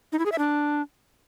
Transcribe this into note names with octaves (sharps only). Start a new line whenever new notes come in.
D#4
E4
G#4
E5
D4